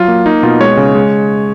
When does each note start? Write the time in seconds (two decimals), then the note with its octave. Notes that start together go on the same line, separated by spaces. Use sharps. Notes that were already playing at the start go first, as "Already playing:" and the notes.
Already playing: F#3 F4
0.08 A#3
0.26 A#3 D#4
0.43 B2 F4
0.60 G#3 C#5
0.77 C#3
0.95 G#3